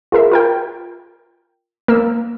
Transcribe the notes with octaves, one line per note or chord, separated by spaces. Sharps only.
F4 G#4 A#4 E5
F4 A#4 G5
A#3 E6